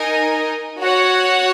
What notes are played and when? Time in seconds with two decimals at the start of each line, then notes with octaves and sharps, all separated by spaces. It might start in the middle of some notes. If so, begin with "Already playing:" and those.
Already playing: D#4 A#4 D#5 G#5
0.80 F#4 C#5 F#5